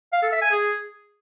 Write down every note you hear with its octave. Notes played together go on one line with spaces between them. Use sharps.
F5
A4
E5
G#5
G#4